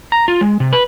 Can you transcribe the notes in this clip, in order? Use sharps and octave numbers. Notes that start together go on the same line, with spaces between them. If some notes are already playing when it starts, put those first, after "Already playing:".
A#5
F4
G#3
C3
B4